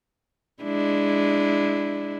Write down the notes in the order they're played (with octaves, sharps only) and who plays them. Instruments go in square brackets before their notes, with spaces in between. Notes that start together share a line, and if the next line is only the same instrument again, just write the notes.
[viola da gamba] G#3 D4 E4